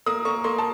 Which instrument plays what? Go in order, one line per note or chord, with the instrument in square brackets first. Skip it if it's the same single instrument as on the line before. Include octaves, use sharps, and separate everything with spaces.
[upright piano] A#3 D#6
A#3 C#6
A#3 C6
A5